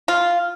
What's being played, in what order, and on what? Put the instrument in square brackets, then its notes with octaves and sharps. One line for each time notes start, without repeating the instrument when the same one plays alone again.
[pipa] F4